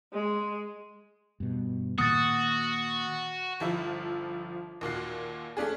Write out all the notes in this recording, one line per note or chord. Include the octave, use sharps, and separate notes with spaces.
G#3
G2 B2
A#2 D#3 A#3 F#4 D#6 A6
G1 F3 E4
D#2 A#2 F#4 C7
A3 C#4 D4 G#4